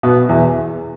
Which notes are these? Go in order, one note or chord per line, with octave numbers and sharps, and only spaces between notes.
B2 B3
E2 E3